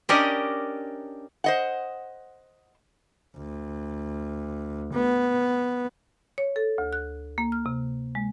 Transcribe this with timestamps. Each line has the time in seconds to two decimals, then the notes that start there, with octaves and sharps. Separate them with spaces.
0.09 C#4 D4 G4 A#4 D5 D#5
1.44 C5 D#5 F#5
3.37 D2
4.93 B3
6.38 C#5
6.56 A4
6.78 D2
6.93 F#6
7.38 A#3
7.52 F6
7.66 C3
8.15 G#3